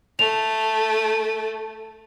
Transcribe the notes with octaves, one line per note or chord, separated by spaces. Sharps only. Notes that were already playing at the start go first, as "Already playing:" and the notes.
A3 F7